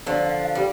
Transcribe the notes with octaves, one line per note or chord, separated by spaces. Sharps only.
D3 F3 D5
F5
F5
G3